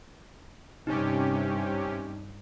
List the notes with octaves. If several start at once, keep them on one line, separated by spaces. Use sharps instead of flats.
G2 C3 C#4 D#4 G4